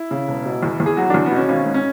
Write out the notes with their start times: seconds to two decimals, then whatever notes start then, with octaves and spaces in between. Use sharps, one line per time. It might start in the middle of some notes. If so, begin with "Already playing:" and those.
Already playing: E4
0.11 C#3
0.28 E1
0.46 B2
0.63 E2
0.80 E2
0.86 G#4
0.97 F#3 F#4
1.10 E2 D4
1.26 B3
1.32 B2 C#4
1.48 G#1 C#4
1.66 G#2
1.74 C#4